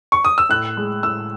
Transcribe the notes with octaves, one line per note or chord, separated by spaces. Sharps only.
C#6
D#6
E6
A2 F#6
G#3
A2 E6